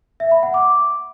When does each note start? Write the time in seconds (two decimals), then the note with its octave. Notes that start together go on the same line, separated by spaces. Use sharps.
0.20 E5
0.31 B5
0.43 F#5
0.54 D6